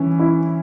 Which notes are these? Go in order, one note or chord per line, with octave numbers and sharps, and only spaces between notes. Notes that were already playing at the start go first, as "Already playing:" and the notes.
Already playing: E3 C#4
E4